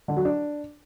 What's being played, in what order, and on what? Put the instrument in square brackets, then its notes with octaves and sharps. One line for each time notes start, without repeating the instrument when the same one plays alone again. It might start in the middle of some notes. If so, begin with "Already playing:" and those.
[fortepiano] D3
F#3
D4